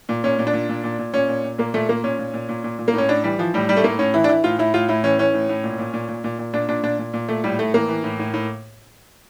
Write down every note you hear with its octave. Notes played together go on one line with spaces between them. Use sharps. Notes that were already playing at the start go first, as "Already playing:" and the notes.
A#2
A#2 C#4
A#2
D4
A#2
A#2
A#2
A#2
A#2 C#4
A#2
A#2
A#2 A#3
A#2 A3
A#2 A#3
A#2 C#4
A#2
A#2
A#2
A#2
A#2
A#3
A2 C#4
A2 D4
E3 G3
E3 F3
A2 G3
A2 G3
A3
A2 A#3
A2 C#4
E3 E4
D4
E3 E4
A2 F4
A2 E4
A2 F4
A2 E4
E3 C#4
E3 C#4
A2
A2
A#2
A#2
A#2
A#2
A#2
A#2
A#2 D4
A#2 D4
A#2 D4
A#2
A#2
A#2 A3
A2 G3
A2 A3
E3 A#3
E3
A2
A2
A2